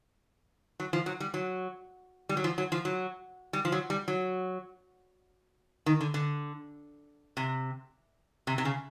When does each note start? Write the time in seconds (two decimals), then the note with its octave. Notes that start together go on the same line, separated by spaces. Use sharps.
0.80 F#3
0.93 F3
1.06 F#3
1.20 G3
1.34 F#3
2.29 G3
2.37 F#3
2.44 F3
2.58 F#3
2.72 F3
2.85 F#3
3.53 G3
3.65 F3
3.72 F#3
3.90 G3
4.08 F#3
5.86 D#3
6.01 D3
6.14 D3
7.37 C3
8.47 C3
8.58 C3
8.65 C#3